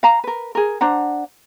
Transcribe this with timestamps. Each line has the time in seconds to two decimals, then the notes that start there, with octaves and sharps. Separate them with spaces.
0.03 F5 A#5
0.24 A#4 B4
0.55 G#4 A#4
0.81 D4 C5 F#5 A#5